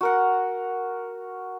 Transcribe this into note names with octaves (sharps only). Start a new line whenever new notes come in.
F#4 A#4 F#5